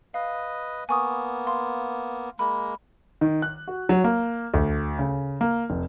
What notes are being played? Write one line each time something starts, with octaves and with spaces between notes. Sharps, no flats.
B4 D#5 F5
A#3 B3 G#5 C#6 D#6
F5 C6
G#3 A#3 B5
D#3
F#6
F#4
F#3
A#3
D2
C#3
A#3
F1